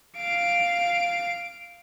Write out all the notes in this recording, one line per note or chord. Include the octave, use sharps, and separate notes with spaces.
F5 D7